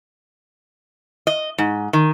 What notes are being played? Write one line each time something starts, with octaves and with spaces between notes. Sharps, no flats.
D#5
G#2
D#3